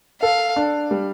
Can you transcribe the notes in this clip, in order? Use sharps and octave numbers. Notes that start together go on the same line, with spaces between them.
A4 F5
D4
G3